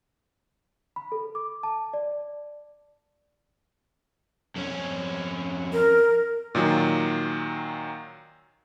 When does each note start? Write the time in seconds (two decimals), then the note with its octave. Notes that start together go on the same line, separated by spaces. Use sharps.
0.96 B5
1.12 A4
1.35 D6
1.63 A5
1.94 D5
4.56 F2 C#4
5.72 A#4
6.55 A#2 D#3 F#3